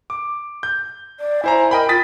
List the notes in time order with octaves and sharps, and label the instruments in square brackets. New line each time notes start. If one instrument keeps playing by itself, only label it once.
[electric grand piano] D6
G6
[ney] D5
[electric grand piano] E4 C5 A#5 [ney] G#5
[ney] A#4 [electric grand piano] D#5 G5 B5
[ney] F4 [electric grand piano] D#6 A6 B6